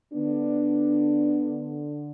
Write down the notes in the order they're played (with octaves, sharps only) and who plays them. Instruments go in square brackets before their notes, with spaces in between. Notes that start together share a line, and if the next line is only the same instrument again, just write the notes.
[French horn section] D3 B3 D4